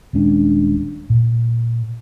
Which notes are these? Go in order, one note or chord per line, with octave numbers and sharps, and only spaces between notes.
D#1 G#3 C#4 D4
A#2